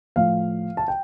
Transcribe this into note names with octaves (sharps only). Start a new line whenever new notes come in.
A2 F3 F5
A5
G5